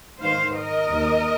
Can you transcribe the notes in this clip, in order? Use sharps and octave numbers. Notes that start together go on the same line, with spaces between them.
G#2 D#3 C5 F5
A#4 D#5
D#2 D#3